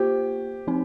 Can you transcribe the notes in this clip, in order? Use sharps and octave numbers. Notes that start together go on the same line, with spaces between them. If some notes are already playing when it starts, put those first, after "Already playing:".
Already playing: A#3 F4 G4 C5
F3 C4 D#4